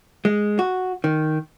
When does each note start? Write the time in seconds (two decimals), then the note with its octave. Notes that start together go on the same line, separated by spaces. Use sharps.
0.25 G#3
0.59 F#4
1.04 D#3